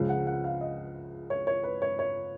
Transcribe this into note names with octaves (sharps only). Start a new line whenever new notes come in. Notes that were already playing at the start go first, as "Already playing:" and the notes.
Already playing: C#2 C#3 F3 G#3
F#5
F#5
F5
D#5
C#5
C#5
B4
C#5
C#5